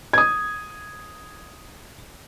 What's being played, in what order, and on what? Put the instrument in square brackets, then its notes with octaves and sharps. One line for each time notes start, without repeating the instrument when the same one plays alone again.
[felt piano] D#6 G#6